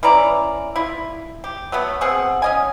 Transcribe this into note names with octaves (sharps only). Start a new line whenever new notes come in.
E3 C#4 D5 A#5
E4 F4
G4
F#3 A3 B3
B2 C4 G#4 F#5
C#4 D#5 G#5